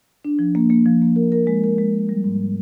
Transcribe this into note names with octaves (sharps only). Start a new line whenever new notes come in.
D4
F3
A#3
A#3
F3
A#3
A#4
A#4
G#3
A#4
G#3
A#4
G3
G#2